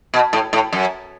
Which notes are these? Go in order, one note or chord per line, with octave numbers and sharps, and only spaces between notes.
B2
A2
A2
F#2